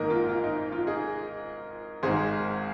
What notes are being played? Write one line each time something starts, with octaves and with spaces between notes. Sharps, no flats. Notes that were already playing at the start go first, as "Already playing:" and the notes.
Already playing: G#1 G#2 D#3 A#3 A#4 D#5
F4
F4
D#4
D#4
F4
D#4 G#4
G#1 G#2 D#3 G#3 G#4 C5